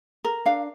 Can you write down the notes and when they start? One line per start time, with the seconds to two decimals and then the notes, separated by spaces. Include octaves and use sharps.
0.24 A#4
0.46 D4 F5